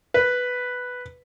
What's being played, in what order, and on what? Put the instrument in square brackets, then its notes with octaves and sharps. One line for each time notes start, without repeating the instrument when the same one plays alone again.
[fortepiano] B4